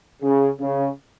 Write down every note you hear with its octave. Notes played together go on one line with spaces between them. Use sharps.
C#3
C#3